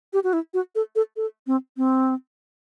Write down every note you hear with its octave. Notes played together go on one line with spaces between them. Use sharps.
G4
F#4
E4
F#4
A4
A4
A4
C4
C4